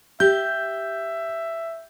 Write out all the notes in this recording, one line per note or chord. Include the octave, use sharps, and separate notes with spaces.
G4 E5 G6